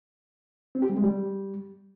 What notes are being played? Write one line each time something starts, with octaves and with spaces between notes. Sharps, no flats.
C4
G4
G3
G#3
G3